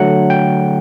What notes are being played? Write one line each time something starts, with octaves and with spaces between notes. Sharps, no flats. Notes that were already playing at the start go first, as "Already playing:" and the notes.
Already playing: D3 F#3 A3 F#5
G5